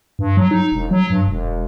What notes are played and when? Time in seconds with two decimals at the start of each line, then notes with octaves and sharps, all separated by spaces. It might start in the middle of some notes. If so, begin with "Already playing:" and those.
0.19 G2
0.37 F#3
0.51 D#4
0.72 E1
0.91 F#3
1.10 G2
1.28 E1